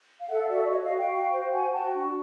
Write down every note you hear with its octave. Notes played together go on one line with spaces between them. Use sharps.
F5
A4 E5 F#5
F5
F#4 D5 E5
D5
F#4 C#5 D#5
E5
D#5 F5
F#4
F5 G5
F#4
C5
F#4 F#5 G#5
F#4 G5 A5
D4